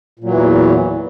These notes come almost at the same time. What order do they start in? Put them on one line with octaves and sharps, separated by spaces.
A#2 F#3 E3 E2